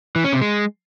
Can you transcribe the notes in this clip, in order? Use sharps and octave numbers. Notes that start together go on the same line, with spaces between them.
E3
C#4
C3
G#3